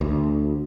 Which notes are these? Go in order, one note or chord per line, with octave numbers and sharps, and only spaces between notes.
D2